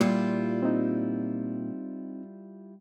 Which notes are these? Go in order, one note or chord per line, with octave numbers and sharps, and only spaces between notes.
A#2 G3 E4 F4
C4 D#4